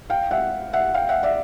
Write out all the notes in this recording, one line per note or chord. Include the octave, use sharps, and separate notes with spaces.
F5 G5
E5 F#5
E5 F#5
F5 G5
E5 F#5
D5 E5